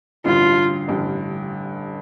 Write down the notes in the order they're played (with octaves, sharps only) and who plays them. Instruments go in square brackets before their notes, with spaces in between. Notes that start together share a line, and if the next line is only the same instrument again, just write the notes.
[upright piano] A1 G2 D3 [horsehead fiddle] F4
[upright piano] A1 G2 D3